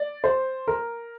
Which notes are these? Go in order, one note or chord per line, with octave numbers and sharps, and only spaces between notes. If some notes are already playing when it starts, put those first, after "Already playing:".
Already playing: D5
C5
A#4